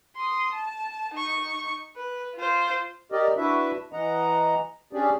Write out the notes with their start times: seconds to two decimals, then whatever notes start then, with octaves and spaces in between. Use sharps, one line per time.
0.16 C6 D#6
0.53 A5
1.14 D#4 C#6
1.96 B4
2.36 F4 C5
3.12 G4 A#4 D5 D#5
3.37 D4 E4 F#4 B4 E5
3.93 E3 D#5 F#5 A#5
4.93 C#4 D4 G4 G#4 D5